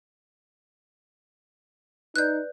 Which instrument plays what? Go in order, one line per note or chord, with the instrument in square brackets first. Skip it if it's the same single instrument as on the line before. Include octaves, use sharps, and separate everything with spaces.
[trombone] D#4 [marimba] B4 D5 [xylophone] F#6 G6